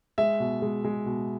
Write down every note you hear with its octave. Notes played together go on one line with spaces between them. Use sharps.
G#3 E5
B2
G#3
G#3
B2